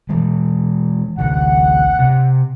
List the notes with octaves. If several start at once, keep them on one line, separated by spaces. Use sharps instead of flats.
E3 G#3
A1 D2 F#5
C3